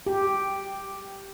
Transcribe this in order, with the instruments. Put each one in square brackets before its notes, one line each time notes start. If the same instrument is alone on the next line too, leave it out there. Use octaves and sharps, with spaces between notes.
[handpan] G4